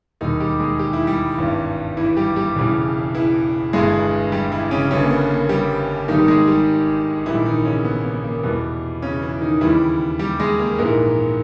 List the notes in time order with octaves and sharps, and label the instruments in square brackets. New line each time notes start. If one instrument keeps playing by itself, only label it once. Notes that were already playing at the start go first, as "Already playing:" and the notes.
[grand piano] E1 D#2 D#3 G3 D#4
G3 G4
G#3 G#4
G4
E4
G3 G4
G#1 G2 E3
E3 E4
G3 G4
G3 G4
E1 E2 C#3 E3 G3
E3 E4
G1 G2 E3 G#3 G#4
G3 G4
E3 E4
C#3 C#4
G1 G2 C#3 G3 C#4
A#3
B3
A#3
G3 G4
G#1 G#2 D#3 G3 D#4
G4
G#3 G#4
G3 G4
A#1 G#2 D#3 E3 G3 E4
D#3 D#4
C#3 C#4
B3
B3
A#3
E2 B2 G3 B3
C#3 C#4
E3 E4
D#3 D#4
D#2 C#3 E3 G3 E4
G3 G4
G#3 G#4
A#3 A#4
A#1 G#2 E3 A#3 A#4